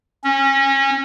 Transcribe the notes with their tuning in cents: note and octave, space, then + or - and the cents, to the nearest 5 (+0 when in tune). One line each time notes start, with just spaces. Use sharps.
C#4 -25